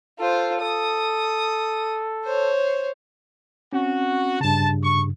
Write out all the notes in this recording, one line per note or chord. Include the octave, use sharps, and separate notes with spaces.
F4 A4 C5
A4 D#6
C5 C#5
C4 C#4 F#4
G2 C#3 A5
C#6